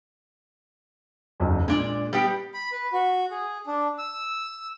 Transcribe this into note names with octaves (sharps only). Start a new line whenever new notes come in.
F#1 B1 E2
A#2 G#3 D4 D5
G3 B3 G4
B5
B4
F#4
G#4
D4
E6